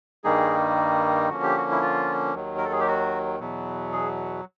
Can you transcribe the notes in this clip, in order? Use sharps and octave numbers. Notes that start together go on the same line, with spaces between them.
G2 D#3 G3 A#3 D#4 G#4
D3 F3 A#3 C#4 F#4
G4
F#4
E4
F4
D#2 D#3 F#3
A#4
A4
G#4
G4
F#4
E2 B2 F#3
G#4